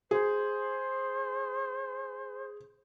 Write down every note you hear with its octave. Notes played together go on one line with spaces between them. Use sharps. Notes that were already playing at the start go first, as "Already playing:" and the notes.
G#4 C5